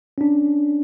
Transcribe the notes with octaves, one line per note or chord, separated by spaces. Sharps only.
C#4 D4